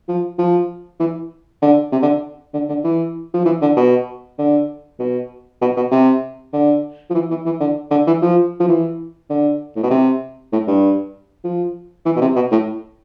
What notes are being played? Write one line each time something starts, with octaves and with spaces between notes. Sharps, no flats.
F3
F3
E3
D3
C3
D3
D3
D3
E3
F3
E3
D3
B2
D3
B2
B2
B2
C3
D3
F3
E3
E3
E3
D3
D3
E3
F3
F3
E3
D3
A2
B2
C3
A2
G2
F3
E3
B2
C3
B2
A2